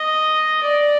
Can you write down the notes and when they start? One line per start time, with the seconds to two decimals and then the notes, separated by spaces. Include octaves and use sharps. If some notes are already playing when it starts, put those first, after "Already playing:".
Already playing: D#5
0.63 D5